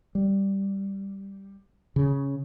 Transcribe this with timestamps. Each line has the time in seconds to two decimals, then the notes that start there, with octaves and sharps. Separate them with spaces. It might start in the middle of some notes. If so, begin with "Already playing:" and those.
0.15 G3
1.96 C#3